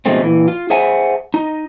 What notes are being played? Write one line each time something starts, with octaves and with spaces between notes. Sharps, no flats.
B2 D3 F3 G#3 A3 C4
A#2 E3
F4
G#4 C5 E5 F#5 G#5 A5
D#4